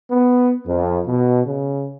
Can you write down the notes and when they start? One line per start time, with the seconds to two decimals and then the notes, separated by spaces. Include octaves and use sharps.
0.11 B3
0.66 F2
1.07 B2
1.46 C#3